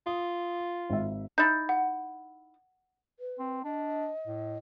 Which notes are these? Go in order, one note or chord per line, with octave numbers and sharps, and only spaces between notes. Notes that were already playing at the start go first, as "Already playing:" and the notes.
F4 D#6
G#1 E5
D#4 E4 G6 A6
F#5
B4
C4
D4 D#5
A2